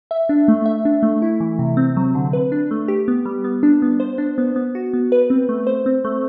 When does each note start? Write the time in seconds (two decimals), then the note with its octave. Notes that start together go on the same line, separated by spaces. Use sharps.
0.11 E5
0.29 D4
0.48 A3
0.66 E5
0.85 D4
1.03 A3
1.22 E4
1.40 E3
1.59 C3
1.77 C4
1.97 F#3
2.15 D3
2.33 B4
2.52 D4
2.71 A3
2.88 G4
3.08 B3
3.26 G3
3.44 B3
3.63 D4
3.82 B3
4.00 C5
4.18 D4
4.38 B3
4.56 B3
4.75 F#4
4.94 B3
5.12 B4
5.30 C4
5.49 A3
5.67 C5
5.86 C4
6.05 A3